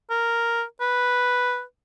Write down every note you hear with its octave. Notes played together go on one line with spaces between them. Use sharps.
A#4
B4